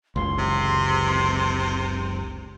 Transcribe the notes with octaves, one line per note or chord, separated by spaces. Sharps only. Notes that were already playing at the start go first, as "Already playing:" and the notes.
F#1 C#2 C6
C3